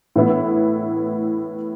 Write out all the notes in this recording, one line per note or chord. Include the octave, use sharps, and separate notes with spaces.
A2 E3 B3 E4